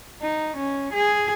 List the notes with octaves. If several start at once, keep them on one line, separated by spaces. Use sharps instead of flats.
D#4
C#4
G#4